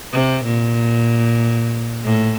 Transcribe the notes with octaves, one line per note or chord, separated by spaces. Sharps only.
C3
A#2
A2